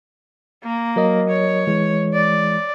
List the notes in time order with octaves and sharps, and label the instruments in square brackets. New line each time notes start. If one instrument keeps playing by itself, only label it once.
[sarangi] A#3
[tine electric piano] F#3 A#4 D#5
[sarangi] C#5
[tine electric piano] E3 G#3
[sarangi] D5